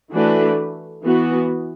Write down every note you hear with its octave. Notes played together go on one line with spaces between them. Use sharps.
E3 A3 D4 F#4 B4
E3 B3 F#4